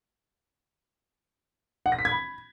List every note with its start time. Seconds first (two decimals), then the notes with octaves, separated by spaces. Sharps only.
1.86 F#5
1.92 A#6
1.99 B6
2.05 G#6
2.12 B5